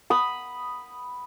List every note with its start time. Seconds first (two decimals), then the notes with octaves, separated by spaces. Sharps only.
0.10 B5 D#6